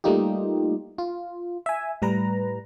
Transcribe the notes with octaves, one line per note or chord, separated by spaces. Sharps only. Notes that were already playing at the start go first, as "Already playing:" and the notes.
G3 A3 A#3 D#4 F4 G4
F4
E5 G#5
A2 G3 B4 A#5